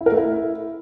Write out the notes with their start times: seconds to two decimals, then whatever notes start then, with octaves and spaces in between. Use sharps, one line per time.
0.01 E4
0.06 A#4
0.12 A3
0.17 E4